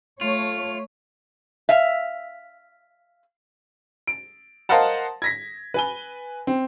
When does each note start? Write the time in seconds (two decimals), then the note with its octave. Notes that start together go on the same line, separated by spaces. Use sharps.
0.21 A3 F4 C#5
1.69 E5 F5
4.07 D7
4.69 A#4 C5 D#5 F5 F#5 A5
5.22 G#6 A#6 B6
5.74 B4 G#5 G7
6.47 C4